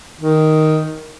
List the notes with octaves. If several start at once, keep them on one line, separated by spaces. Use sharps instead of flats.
D#3